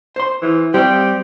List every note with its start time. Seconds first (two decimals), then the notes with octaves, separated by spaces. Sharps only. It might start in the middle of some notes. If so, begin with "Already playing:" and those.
0.16 C5 C6
0.42 E3
0.74 G3 C4 G4